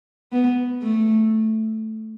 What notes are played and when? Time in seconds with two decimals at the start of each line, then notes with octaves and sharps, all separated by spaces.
0.32 B3
0.82 A3